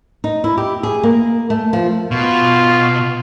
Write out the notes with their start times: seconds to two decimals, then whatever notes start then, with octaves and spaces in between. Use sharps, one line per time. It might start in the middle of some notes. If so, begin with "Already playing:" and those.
0.24 D#4
0.44 E4
0.57 G4
0.83 G#4
1.03 A#3
1.50 A3
1.73 F3
2.11 B2 F4